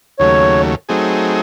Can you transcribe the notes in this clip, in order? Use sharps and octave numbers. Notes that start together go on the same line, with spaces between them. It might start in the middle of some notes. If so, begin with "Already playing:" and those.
D#2 C#3 F#3 A3 C#5
F#3 A3 C4 D#4 G#4